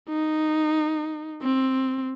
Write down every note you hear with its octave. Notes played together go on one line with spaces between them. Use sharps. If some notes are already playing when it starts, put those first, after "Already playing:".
D#4
C4